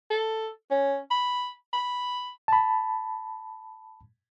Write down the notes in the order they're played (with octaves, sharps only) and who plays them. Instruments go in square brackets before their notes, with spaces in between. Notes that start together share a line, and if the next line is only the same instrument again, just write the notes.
[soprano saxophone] A4
C#4
B5
B5
[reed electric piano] A5 B5